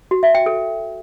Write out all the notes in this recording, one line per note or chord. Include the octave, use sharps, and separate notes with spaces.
F#4
E5
G5
A4